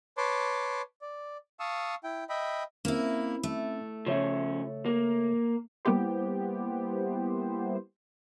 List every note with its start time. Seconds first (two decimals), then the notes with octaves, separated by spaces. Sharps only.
0.17 B4 C#5 A5 C6 D6
1.02 D5
1.60 F5 A5 C#6 D#6 E6
2.04 E4 G5
2.29 D#5 E5 G5 B5
2.85 A#3 C4 C#4 E4
3.43 A3
4.06 C#3 F3 C#4 C#5 E5
4.86 A#3
5.85 G3 A#3 B3 E4 G4 C5